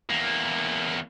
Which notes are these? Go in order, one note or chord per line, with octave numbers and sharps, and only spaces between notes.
E2 A#3